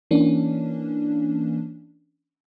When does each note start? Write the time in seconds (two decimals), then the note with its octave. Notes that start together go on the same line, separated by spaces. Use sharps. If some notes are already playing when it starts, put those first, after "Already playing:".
0.11 E3 A#3 C#4 D4